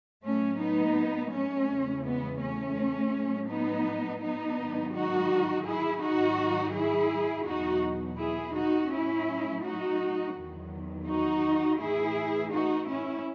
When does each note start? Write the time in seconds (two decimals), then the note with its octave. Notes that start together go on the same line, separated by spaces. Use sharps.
0.23 A2 F#3 A3 C#4
0.60 B3 D#4
1.32 A3 C#4
1.68 E2 C#3 E3
2.04 G#3 B3
2.41 A3 C#4
3.13 A2 F#3
3.48 B3 D#4
4.20 B3 D#4
4.57 G#2 D#3 F#3
4.93 D#4 F#4
5.66 E4 G#4
6.01 G#2 D#3 F#3 D#4 F#4
6.74 E4 G#4
7.46 E2 B2 F#3 D#4 F#4
8.17 E4 G#4
8.54 D#4 F#4
8.90 A2 F#3 C#4 E4
9.62 D#4 F#4
10.34 E2 D#3 F#3
11.06 D#4 F#4
11.78 A2 E3 E4 G#4
12.51 D#4 F#4
12.88 C#4 E4